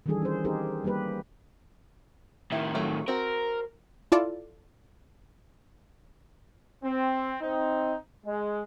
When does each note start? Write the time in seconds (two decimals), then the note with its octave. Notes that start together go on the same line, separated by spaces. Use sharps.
0.06 D#3 E3 G3 D4 G#4 A4
0.22 C#4 C5
0.44 C4 D#4 G4 G#4 A#4 C5
0.84 G3 A#3 G4 B4
2.52 A2 D#3 E4
2.75 F#3 A3 F4
3.08 C4 F#4 A#4
4.12 E4 F4 A4 D5 A5
6.83 C4
7.41 C4 D#4
8.25 G#3